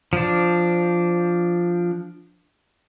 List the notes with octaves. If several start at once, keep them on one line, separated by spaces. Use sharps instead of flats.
F3 D4